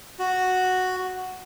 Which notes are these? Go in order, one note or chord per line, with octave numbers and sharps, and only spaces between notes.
F#4